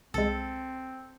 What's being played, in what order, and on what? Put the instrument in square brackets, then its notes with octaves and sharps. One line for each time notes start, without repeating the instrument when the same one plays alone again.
[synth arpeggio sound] C2 G#3 [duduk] C4 [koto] A4